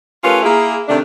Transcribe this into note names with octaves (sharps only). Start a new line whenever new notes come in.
A3 C#4 F4 G4 A#4 B4
A#3 E4 G#4
C3 D#3 A3 D4